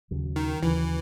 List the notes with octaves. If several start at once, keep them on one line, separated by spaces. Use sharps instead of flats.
D#2 C#3 F#3
D#3
D#2 C#3 E3 F#3